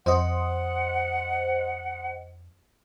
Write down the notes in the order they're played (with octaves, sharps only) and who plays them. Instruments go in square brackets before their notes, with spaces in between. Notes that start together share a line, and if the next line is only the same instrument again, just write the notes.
[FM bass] F2 [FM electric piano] C5 D#5 [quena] F#5